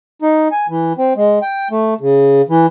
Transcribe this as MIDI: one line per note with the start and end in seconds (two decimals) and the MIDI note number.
0.22 0.48 63
0.52 0.67 80
0.68 0.93 52
0.98 1.13 60
1.16 1.39 56
1.42 1.68 79
1.71 1.94 57
2.01 2.42 49
2.49 2.66 52